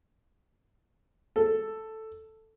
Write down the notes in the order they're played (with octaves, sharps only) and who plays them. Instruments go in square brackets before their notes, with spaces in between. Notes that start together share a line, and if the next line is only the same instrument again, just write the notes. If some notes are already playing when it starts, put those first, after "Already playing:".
[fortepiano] A4